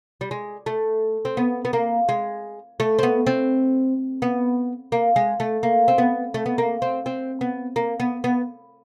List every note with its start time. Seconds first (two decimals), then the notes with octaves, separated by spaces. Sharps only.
0.21 G3
0.31 G#3
0.66 A3
1.25 C4
1.37 B3
1.65 B3
1.73 A#3
2.09 G#3
2.80 A3
2.99 C4
3.03 B3
3.26 C4
4.22 B3
4.92 A#3
5.16 G#3
5.40 A3
5.63 A#3
5.88 C4
5.98 B3
6.34 A3
6.46 B3
6.58 A#3
6.82 C4
7.06 C4
7.41 B3
7.76 A#3
8.00 B3
8.24 B3